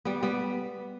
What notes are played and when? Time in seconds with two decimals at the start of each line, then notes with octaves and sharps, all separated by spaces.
0.05 G3 B3
0.23 G3 B3